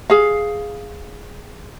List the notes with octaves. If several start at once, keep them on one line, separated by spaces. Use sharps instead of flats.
G#4 F5